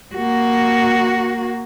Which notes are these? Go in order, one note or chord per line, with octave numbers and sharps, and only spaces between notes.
A#3 F#4